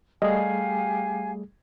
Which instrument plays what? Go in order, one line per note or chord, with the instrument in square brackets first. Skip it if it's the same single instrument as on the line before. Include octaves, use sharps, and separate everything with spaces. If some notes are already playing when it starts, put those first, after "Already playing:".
[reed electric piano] G3 A3 G#4 [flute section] G4 F5 G#5 [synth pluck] D#5